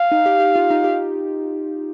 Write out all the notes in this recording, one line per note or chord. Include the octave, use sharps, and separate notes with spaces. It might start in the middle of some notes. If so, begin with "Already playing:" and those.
Already playing: F5
D#4
G4
G4
F4
D#4
G4